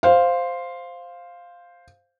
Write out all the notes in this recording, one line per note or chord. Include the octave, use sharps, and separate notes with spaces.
C5 F5